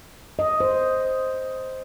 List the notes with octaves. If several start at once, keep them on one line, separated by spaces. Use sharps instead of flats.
D#5
C5